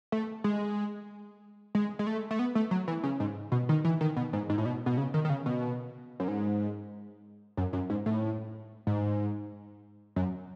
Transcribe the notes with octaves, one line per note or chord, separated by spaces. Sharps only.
A3
G#3
G#3
G#3
A3
A3
B3
A3
F#3
E3
C#3
G#2
B2
D#3
E3
D#3
B2
G#2
G#2
A2
B2
B2
C#3
D#3
D#3
C#3
B2
F#2
G#2
F#2
F#2
G#2
A2
G#2
F#2